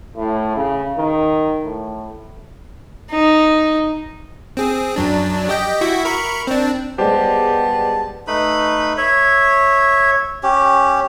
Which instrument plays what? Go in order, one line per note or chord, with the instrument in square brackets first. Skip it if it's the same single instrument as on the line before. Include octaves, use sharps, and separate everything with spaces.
[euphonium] A2
C#3
D#3
A2
[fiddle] D#4
[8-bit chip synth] C4 G#4
F#2 F#3 D4
G4 D#5 G5
E4 F#4 E5
A#4 B5 C#6
C4 D4
[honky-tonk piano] G3 G#3 [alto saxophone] B3 [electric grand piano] G4 C5 [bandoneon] A5
[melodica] A3 D#4 B4 B5
C#5 E5
C#4 G4